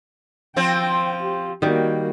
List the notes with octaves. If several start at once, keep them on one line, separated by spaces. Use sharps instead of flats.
F3 C4 C5 G5
G4
D#3 G3 A#3 F#4